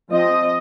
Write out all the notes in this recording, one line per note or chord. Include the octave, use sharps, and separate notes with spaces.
F3 C4 D#5